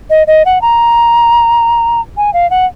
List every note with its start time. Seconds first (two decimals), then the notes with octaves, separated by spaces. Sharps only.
0.10 D#5
0.27 D#5
0.45 F#5
0.62 A#5
2.17 G#5
2.33 F5
2.50 F#5